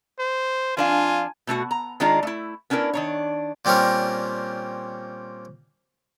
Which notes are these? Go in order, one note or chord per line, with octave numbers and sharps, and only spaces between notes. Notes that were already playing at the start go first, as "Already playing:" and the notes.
C5
F2 D4 F4 F5 G#5
B2 A3 D#4 F#4
A#5
D#3 G#3 D4 F4 D#5 A#5
A3 E4
B3 C#4 D4 E4 A#4
D#3 D4 C#5
A#2 G3 C4 C#4 A#4